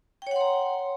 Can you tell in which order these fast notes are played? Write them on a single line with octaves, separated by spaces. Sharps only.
G5 C#5 F#5 C6 A#5